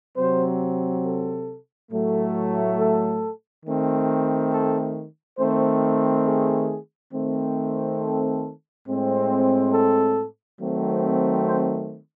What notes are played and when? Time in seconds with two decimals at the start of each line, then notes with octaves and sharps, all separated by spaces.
0.17 C3 F#3 C4 C5
1.04 A4
1.91 A2 F#3 A3
2.77 A4
3.64 D#3 A3 C4
4.51 A4
5.38 D#3 A3 C4 C5
6.25 G#4
7.12 D#3 A3 C4
7.99 A4
8.86 A2 G#3 C4
9.72 A4
10.59 D#3 F#3 A3 C4
11.46 C5